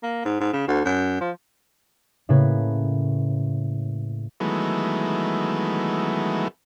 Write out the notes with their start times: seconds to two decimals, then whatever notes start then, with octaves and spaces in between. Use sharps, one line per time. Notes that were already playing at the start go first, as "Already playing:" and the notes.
0.03 A#3
0.25 G#2
0.40 G#2
0.53 C#3
0.68 D2
0.85 F#2
1.21 F3
2.29 A2 C#3 A#3 B4 G#6
4.40 D#3 E3 F#3 G#3 A3 B3